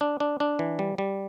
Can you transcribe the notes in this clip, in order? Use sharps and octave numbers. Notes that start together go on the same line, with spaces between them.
D4
D4
D4
E3
G3
G3